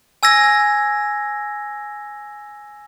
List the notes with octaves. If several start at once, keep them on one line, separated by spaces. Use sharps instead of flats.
G#5 E6 G#6 A#6